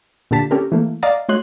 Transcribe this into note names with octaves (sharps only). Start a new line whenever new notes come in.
A#2 D3 G4 A5 B6
C#4 G4 A4 A#4
E3 A3 A#3
D5 D#5 F5 A#5 D#6 A6
A3 F#4 C#5 D#5 C6 F#6